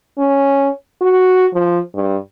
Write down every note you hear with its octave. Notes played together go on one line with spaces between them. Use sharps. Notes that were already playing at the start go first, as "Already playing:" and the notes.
C#4
F#4
F3
G2